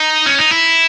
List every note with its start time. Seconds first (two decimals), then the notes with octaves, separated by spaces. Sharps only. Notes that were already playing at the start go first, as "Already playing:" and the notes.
Already playing: D#4
0.26 C#4
0.39 D#4
0.51 E4